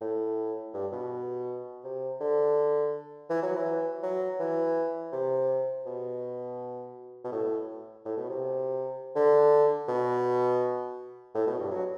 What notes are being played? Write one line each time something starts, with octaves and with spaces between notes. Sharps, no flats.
A2
G2
B2
C3
D3
E3
F#3
E3
F#3
E3
C3
B2
B2
A2
A2
B2
C3
D3
B2
A2
B2
G2
F#3